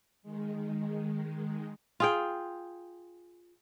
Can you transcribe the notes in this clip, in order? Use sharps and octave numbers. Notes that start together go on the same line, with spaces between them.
D#3 G#3
F4 G#4 G5